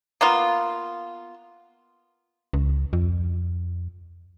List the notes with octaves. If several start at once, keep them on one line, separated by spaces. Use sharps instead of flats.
A#3 B3 F4
C#2
F2